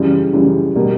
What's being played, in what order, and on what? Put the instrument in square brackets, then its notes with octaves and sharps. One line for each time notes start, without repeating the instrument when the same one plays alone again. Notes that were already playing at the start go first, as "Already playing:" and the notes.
Already playing: [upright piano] F#2 C#3 E3 G3
F#2 C#3 E3 G3
B2 G3 A#3